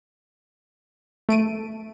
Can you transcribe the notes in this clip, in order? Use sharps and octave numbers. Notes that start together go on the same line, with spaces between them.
A3 D7 D#7